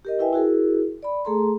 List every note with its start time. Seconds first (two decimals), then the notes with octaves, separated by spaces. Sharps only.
0.05 G4 A#4 D#5
0.19 E4 B4 E5 G5 G#5
0.33 E4 F#4 G#4 A#4
1.03 D5 B5
1.25 A3 G#4 A4 A#5 C6